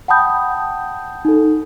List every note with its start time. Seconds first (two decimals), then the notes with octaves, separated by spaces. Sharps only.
0.08 F#5 G5 A5 B5 D#6 G6
1.25 D#4 A4